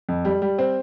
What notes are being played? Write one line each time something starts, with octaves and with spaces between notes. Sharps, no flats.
F2
G3
G3
C4